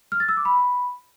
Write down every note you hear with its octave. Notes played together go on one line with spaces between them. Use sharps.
F6
A6
E6
D6
B5